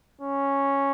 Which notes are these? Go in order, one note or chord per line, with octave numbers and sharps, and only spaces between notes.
C#4